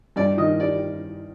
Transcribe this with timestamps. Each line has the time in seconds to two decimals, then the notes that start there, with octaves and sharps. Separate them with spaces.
0.16 G2 D5
0.38 D#3 D#5
0.60 G3 D5